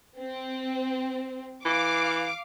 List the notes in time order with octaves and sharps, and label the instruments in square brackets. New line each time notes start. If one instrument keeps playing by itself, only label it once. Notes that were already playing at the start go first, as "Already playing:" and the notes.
[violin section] C4
[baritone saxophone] E3 [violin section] F5 D6